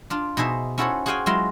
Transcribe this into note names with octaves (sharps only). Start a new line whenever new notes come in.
D4 F4
B2 D#4 G#4 C5 E5
C#4 E4 F#4 A4 C5 C#5
F#4 G#4 C5 F5 G5 G#5
F#3 G#3 E4 F4 C6